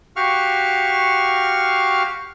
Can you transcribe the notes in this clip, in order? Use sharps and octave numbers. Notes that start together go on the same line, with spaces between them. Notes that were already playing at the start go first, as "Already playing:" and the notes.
F#4 G4 F5 C#6 F6